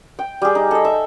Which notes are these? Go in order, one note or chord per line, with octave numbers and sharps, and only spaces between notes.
G5
G3 G#4
D#4
A4 D#5
E5